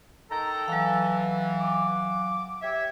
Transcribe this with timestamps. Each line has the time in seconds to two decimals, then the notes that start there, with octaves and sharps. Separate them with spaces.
0.31 D#3 A4 G5 A#5
0.68 E3 F#3 F5
1.60 D6
2.62 G4 C#5 E5